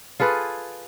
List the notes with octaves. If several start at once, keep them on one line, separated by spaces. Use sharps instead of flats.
F4 G#4 A4 B4